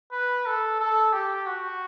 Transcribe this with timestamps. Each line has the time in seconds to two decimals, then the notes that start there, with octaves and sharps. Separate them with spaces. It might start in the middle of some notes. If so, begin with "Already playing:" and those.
0.12 B4
0.46 A4
0.80 A4
1.13 G4
1.46 F#4